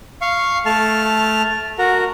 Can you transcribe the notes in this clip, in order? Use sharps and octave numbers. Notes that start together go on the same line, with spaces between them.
F5 C#6
A3 A5 F6
F#4 A#4